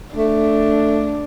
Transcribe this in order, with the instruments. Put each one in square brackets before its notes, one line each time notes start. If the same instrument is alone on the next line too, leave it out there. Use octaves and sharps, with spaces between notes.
[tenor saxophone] A3 [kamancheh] D4